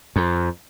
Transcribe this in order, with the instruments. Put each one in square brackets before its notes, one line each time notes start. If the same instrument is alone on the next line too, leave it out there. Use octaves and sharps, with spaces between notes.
[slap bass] F2